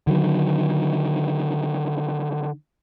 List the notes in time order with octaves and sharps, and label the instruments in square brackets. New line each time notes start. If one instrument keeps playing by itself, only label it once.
[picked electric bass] D3 D#3 F#3